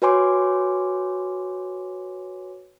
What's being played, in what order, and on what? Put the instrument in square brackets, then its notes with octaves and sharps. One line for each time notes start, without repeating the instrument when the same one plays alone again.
[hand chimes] F#4 B4 C#5 G#5 C6 D6